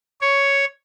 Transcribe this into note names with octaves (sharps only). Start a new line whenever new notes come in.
C#5